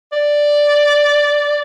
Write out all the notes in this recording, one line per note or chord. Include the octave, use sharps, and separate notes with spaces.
D5